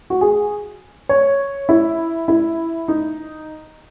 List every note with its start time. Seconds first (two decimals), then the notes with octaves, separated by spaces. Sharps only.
0.10 F#4
0.21 G#4
1.09 C#5
1.69 E4
2.28 E4
2.88 D#4